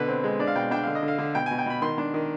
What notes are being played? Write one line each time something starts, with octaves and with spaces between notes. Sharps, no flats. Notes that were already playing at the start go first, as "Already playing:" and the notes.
Already playing: B2 D3 B4
C4
G#3
D4 D5
F5
B2 G5
D4 G5
D3 F5
D#5
D3
F5
D3
B2 G5
G#5
B2
G5
B2 B5
D#3 C6
D4
D#3